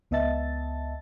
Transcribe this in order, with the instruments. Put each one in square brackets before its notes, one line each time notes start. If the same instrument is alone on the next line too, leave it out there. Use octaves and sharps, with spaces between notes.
[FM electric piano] C#2 B3 D#5 E5 A5 A6